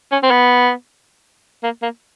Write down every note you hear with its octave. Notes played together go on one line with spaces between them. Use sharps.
C#4
C4
B3
A#3
A#3